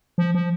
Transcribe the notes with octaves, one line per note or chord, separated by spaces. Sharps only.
F3
F3